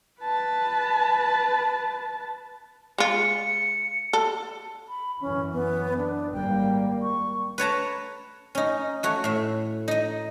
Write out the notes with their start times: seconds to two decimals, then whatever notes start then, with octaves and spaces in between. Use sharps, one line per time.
0.21 B4 A5
2.98 G#3 F4 C#7
4.13 A4
4.89 B5
5.21 F#2 E3 C#4
5.53 B3
5.97 D4
6.33 G#1 G3 A#3 G5
7.02 C#6
7.58 B4 C#5 A5 A#5
8.55 C#4 D#4
9.03 A3 F#4 C#5
9.24 A2 E5
9.88 D#4 D#5